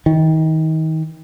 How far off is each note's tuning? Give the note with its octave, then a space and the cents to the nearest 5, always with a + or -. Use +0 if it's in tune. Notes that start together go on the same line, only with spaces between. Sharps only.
D#3 +30